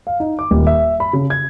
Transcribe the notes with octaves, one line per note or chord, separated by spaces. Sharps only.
F5
D#4
D6
D#1
E5
B5
C#3
G#6